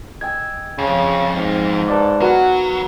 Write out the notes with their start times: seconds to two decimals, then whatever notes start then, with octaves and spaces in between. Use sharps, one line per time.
0.21 D#5 G5 G#5 E6 G#6
0.79 F2 C#3
1.36 G#2 F5
1.88 D#4 B4 D5 A5 D6
2.21 F#3 B3 F#4 A#4 B4 F#5